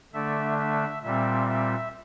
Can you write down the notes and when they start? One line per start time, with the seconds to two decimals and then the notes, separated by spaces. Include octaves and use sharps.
0.13 D3 A3 D4 E5
0.58 E5
1.03 A#2 G3 C4 E5
1.48 E5